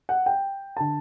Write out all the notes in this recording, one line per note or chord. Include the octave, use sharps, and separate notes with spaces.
F#5
G5
D3 A5